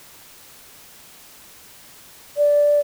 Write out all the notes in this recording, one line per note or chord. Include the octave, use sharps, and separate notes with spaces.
D5